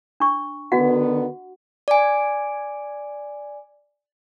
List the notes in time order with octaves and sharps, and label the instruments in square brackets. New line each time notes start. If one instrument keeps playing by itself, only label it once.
[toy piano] D4 C#6
[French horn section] D3 D#3 B3 [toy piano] F#4 D#5 F#5
[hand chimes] D5 G#5